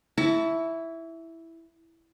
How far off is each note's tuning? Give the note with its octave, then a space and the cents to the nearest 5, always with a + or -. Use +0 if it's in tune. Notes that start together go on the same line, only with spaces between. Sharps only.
E4 +0 A5 +0 C#6 +40